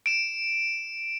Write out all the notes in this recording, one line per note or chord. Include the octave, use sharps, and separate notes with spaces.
D7 E7